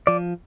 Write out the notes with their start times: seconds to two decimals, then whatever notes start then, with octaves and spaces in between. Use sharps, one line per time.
0.07 F3 D5